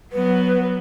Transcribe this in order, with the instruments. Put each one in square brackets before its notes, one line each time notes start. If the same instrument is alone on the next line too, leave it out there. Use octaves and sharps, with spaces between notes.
[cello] F#3 B3 [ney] B4